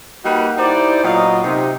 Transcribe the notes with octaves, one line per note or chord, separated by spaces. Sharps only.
G3 A#3 D#4 F#4 B4 F#5
D#4 E4 G4 C5 D5
A#2 F#3 B3 F4 D#5
C3 D#4